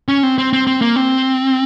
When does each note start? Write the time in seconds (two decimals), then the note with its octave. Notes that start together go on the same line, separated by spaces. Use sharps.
0.08 C#4
0.23 C4
0.38 C4
0.53 C4
0.67 C4
0.81 A#3
0.96 C4